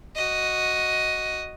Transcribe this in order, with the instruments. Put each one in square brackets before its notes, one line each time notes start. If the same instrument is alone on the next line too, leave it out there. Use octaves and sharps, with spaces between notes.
[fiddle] F#4 D#5